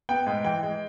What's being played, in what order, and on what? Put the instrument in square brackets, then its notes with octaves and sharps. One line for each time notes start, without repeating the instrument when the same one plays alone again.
[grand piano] B3 G5
G#2
E3 G5
G#3